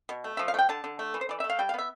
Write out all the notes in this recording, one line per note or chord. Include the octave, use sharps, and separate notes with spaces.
B2
A3
F3 E5
F5
A3
G5
D3 A5
D3
A3
E3
C5
E3 D5
A3 E5
F5
G3 G5
F5
B3 E5